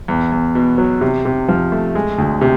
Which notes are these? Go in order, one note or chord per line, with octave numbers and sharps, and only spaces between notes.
E2
E2
B2
F#3
C3
C3
F3
A3
G#3
D2
C3